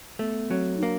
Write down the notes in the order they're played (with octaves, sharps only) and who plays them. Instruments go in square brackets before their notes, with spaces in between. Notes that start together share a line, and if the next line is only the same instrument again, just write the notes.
[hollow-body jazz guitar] A3 [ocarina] B3
[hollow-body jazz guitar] F#3 [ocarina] C4
[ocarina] D#4
[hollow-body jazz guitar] A#3 [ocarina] D4